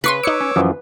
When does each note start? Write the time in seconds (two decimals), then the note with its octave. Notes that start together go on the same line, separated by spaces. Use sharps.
0.04 C#3 B4 C6 C#6 C7
0.24 D#4 C#5 D6 E6 C#7
0.41 C#4
0.56 F#2 E3 F3